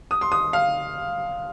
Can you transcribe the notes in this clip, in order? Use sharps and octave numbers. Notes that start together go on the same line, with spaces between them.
D#6
C6
D#6
F5